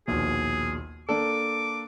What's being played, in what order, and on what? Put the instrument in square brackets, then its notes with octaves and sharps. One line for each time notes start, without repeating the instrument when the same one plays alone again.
[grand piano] A#1 D#2 B2 [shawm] G#4
[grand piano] A#3 D4 A4 [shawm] D6